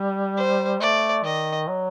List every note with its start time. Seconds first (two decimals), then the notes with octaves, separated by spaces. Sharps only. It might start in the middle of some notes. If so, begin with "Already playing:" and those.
Already playing: G3
0.37 C5
0.81 A3 D5
1.24 D#3 D#5
1.68 F#3